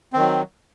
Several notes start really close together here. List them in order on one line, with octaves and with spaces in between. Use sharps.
C4 D#3 F#3